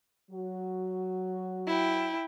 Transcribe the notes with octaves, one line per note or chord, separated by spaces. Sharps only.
F#3 F#4
E4 G5